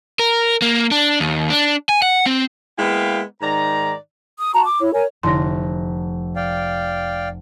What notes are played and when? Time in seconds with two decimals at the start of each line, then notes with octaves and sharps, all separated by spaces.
0.19 A#4
0.62 A#3
0.91 D4
1.20 D#2
1.50 D4
1.89 G#5
2.02 F#5
2.26 C4
2.79 G#3 A#3 B3 E4 F5 G5
3.41 G#2 D#3 D5 A#5
4.38 D#6
4.53 F#4 A5 A#5
4.66 D6
4.79 E4 C#5
4.93 A#4 C#5 G#5
5.23 F1 D3 E4 C6 A#6
6.36 D5 F5 G5